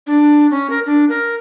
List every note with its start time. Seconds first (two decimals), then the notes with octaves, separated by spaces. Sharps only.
0.07 D4
0.51 C#4
0.70 A#4
0.86 D4
1.09 A#4